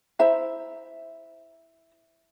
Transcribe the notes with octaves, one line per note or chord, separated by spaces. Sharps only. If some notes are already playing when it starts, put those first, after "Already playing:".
E4 C5 E5 A#5